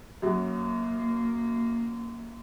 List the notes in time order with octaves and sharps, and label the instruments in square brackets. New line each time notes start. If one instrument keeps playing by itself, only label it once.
[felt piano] F#2 F#3 [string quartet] A#3